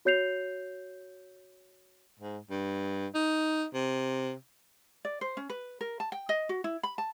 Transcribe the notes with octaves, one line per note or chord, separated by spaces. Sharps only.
F#4 C#5 G6 C7 F7
G#2
G2
D#4
C3
D5
C5
C#4
B4
A#4
A5
G5
D#5
F#4
E4
B5
A5